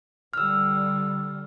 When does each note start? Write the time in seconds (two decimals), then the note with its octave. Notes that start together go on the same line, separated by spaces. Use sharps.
0.33 D3 G3 E6 F6